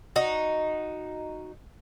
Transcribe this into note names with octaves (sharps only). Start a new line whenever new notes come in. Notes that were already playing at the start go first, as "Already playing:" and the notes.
D#4 F#4